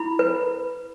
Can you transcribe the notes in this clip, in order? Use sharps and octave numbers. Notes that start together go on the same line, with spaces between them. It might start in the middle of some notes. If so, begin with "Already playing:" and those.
Already playing: E4 B5
B4